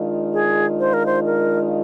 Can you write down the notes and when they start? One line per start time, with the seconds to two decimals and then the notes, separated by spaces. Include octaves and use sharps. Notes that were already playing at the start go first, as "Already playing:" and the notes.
Already playing: D#3 G#3 D4 F4
0.33 G#4
0.80 C5
0.94 A#4
1.06 C5
1.26 A#4